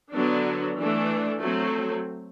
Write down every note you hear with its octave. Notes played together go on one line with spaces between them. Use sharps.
D3 F#3 B3 D4
E3 A3 D4
F#3 A3 C4